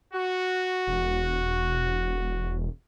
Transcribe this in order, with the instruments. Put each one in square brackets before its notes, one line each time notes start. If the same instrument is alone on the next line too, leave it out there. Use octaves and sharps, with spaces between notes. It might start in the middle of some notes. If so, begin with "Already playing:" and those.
[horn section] F#4
[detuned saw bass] E1